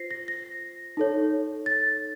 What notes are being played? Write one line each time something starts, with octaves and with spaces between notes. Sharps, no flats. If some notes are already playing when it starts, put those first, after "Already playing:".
Already playing: F4 C5 A#6 C7
A#6
A#6
D#4 A4 C#5
A6